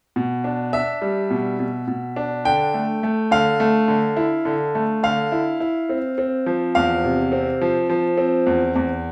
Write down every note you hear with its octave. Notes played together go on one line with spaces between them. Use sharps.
B2
D4
D4 E5
G3
B2
B2
B2
D4
D3 G5
A3
A3
D3 F5
A3
D3
E4
D3
A3
D3 F5
E4
E4
C4
C4
F3
E2 F5
C3
C4
F3
F3
C4
E2
E2